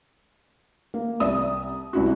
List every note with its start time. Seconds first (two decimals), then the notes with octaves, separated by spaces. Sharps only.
0.94 A#3
1.20 C2 D5 E5 D#6
1.93 C2 E4 F#4